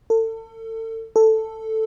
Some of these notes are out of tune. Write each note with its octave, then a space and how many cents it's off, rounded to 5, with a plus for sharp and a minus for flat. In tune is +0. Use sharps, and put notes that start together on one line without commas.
A4 +35
A4 +5